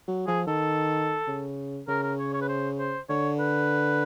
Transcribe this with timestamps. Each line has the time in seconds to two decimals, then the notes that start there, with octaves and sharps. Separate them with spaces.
0.07 F#3
0.27 F3 G#4
0.47 D#3 A4
1.27 C#3
1.88 C#3 A#4
2.03 A#4
2.19 C#5
2.34 C#5
2.41 B4
2.48 C5
2.79 C5
3.09 D3 C#5
3.39 B4